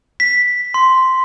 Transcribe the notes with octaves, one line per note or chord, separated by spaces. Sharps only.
B6
C6